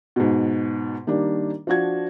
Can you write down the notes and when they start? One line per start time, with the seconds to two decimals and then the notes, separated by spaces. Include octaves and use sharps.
0.16 G#2 B2
1.07 D#3 G3 A#3 D4
1.67 F3 D4 F#4 G#6